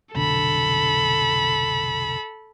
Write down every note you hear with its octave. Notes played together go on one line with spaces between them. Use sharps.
F1 B1 D3 A4 B5